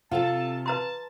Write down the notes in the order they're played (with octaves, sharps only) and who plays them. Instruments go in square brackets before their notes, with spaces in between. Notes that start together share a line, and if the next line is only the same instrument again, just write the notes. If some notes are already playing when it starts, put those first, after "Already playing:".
[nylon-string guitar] C3 C4 [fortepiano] F4 [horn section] A4 A5
[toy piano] B4 A#5 C6 [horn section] A5